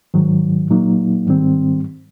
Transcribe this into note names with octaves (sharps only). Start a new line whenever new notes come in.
G#2 D#3 F#3
A#2 F#3 A#3 D#4
G#2 D#3 G3 C4